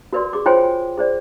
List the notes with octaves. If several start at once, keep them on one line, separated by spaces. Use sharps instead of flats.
F#4 A#4 B4 D5 C6
G#4 D6
F4 C5 C#5 G5 G#5 C6
G#4 C5 D5